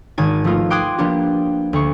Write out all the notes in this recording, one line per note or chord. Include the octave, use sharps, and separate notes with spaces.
G#1 D#3 G#5 A5
F3 A3 B3 D#4 F4
G5 C6 D6 D#6 F#6 G#6
F3 A#3 B3 D4 F4 G4
D2 C#6